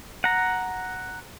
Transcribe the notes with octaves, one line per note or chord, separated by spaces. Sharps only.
F#5 A#5